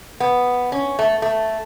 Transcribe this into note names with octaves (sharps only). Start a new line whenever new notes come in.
B3
C#4
A3
A3